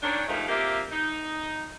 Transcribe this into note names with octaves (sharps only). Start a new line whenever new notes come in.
D#3 C#4 D4
D#2 D#3 F3 G#3 A3 D#4
A#3 C4 D4 F4 G4 E5
D#4